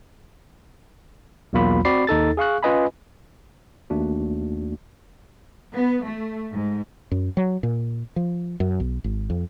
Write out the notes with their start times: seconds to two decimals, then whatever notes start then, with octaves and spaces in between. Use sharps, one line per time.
1.53 B1 E2 F#3 A#3 F4 B5
1.85 C4 F#4 D5 B5 C7
2.07 D#2 D#4 A4 A6
2.37 G#4 F5 C#6 F#6
2.63 C#4 F4 B4 D#5 G#5 B5
3.90 D#2 A3 D4 F#4
5.75 B3
6.04 A3
6.52 G#2
7.11 F#2
7.37 F#3
7.63 A#2
8.16 F3
8.60 F#2
8.80 B1
9.04 G#1
9.30 F2